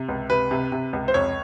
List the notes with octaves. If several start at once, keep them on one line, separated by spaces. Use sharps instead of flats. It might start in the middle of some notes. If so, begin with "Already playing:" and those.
Already playing: C3
C#2
C3 B4
C3
C3
C#2
C5
F2 C#5